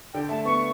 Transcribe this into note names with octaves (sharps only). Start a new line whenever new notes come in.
D3 G5
A3 A5
B3 C#6